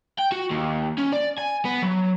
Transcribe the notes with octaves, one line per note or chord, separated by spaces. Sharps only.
G5
F#4
D#2
C#4
D5
G#5
B3
F#3